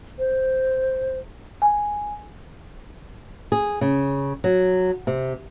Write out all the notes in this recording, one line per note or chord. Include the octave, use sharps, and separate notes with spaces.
C5
G#5
G#4
C#3
F#3
C3